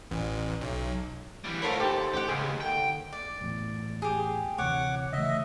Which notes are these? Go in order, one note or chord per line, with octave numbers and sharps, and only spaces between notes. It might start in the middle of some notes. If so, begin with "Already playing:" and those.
A1
B1
E3 G3
G#2 A3 F4 A#4 C#5 B5 C6
D#2 G4 A4 C5
A1 G4 F#5
C#2 G#4
D3 G5
D5
A1 E2 A2
G4 G#4
D2 C3 E3 C#5 F#5 D6
C#3 E3 A3 D#5 E5